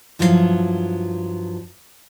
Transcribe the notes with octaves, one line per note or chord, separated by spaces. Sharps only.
G2 F3 F#3 E4 A4 F5